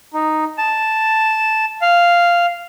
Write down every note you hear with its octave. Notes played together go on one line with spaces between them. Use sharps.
D#4
A5
F5